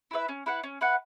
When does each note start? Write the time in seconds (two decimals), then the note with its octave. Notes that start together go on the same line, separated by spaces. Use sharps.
0.11 E4 B4 E5
0.28 C#4
0.46 E4 B4 F#5
0.63 C#4
0.81 E4 B4 F#5